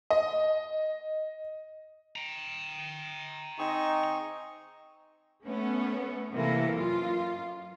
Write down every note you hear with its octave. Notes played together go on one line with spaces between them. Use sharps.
D#5
G5 A#5
C4 D#4 G#4 C#6
A3 B3 C#4
C3 E3 A#3 E4 A4 A#4
F#2 F4